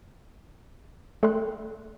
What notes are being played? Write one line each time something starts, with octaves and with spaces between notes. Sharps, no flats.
A3 A4 D5 G5 C6 F#6